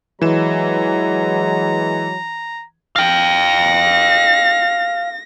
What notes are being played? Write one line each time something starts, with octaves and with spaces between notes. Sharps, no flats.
E3 F#3 G#3 A#5 E7
F5 G5 A#6